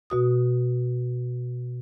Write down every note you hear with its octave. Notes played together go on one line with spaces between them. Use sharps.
B2 F#4 D#6